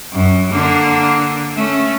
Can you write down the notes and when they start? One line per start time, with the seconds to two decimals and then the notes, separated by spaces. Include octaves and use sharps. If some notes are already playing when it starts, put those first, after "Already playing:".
0.12 F#2
0.51 D3 A#3
1.56 A3 C#4